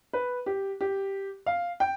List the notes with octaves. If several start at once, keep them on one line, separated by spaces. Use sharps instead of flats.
B4
G4
G4
F5
G5